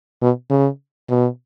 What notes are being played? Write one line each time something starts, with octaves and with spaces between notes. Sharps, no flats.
B2
C#3
B2